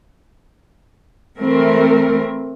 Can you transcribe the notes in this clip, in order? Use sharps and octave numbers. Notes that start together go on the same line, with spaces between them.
E3 A3 C4 A#4